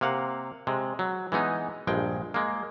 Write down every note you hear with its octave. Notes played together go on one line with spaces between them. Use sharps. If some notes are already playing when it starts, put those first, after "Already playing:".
C3 A#3 F5 F#5
C3 G#3
F#3
E3 G#3 B3 D#4
A#1 G2 G#3 G5
G#3 A#3